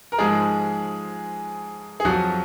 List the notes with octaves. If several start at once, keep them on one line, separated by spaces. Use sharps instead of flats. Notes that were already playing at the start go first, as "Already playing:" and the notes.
A#4
G#2 F3 G#3 G#4
G#4
F2 F3 F#3 F#4